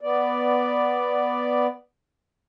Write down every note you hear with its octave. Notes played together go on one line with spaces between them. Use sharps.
B3 D5